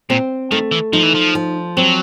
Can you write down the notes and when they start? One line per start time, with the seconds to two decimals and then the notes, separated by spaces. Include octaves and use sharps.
0.10 A#2 C4
0.51 D#3 A3
0.72 E3
0.93 F3 D#4
1.03 E3
1.15 F3
1.35 F3
1.77 F#3 C4